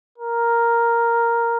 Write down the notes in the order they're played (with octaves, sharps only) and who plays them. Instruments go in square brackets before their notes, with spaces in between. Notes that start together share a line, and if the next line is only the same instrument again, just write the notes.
[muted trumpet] A#4